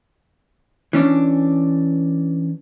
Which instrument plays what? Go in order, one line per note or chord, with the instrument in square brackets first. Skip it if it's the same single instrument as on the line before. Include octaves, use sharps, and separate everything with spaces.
[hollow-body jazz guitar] E3 C#4 D4